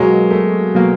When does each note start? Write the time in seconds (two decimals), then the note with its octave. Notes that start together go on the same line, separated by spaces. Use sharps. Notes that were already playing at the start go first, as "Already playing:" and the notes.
Already playing: B2 F#3 G#3 A#3
0.30 A3
0.75 B2 F#3 A#3